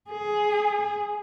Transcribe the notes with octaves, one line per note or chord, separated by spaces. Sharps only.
G#4